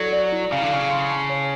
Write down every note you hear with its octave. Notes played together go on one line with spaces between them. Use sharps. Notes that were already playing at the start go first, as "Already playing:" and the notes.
Already playing: F#3 E4 A4 D5
D5
E4
C#3 F5
D3
C#3 F5
C6
A5
C#5